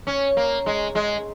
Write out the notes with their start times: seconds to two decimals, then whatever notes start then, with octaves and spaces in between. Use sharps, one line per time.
0.07 C#4
0.37 A#3
0.66 G#3
0.95 G#3